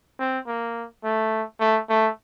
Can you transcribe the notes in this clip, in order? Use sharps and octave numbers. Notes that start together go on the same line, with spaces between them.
C4
A#3
A3
A3
A3